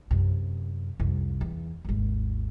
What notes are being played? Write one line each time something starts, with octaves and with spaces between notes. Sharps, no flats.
F#2 C3
C2 F2
E2
G#1 D#2